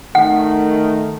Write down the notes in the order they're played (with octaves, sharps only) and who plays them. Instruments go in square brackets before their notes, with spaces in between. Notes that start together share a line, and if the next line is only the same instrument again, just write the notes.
[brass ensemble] D#3 A3 [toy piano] F#5